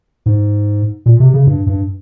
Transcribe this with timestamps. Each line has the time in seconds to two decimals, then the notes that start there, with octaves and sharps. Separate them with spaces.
0.26 G#2
1.06 A#2
1.20 C3
1.34 C#3
1.46 G2
1.66 G2